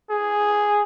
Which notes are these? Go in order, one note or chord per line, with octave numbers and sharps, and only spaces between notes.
G#4